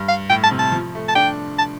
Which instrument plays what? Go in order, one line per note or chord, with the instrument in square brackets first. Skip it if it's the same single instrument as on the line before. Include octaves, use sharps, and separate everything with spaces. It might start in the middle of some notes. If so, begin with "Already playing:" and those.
Already playing: [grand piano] G2
[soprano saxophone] F5
[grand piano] A2 [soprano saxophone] G5
[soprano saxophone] A5
[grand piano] C3
[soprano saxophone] A5
[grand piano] F3
A3
[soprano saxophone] A5
[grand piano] D4 [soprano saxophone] G5
[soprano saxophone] A5